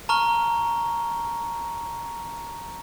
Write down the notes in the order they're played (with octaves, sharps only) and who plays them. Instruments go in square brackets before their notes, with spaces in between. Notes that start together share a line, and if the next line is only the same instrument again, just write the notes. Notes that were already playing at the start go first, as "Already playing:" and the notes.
[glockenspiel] A5 A#5 C#6 F6 G7